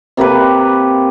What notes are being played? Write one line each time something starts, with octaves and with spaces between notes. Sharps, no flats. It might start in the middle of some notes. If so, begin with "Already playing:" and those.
C3 A#3 G4 B4